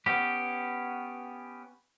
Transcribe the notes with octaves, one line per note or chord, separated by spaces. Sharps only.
B3 C#4 G4